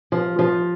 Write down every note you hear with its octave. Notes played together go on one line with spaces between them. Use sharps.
F3
F3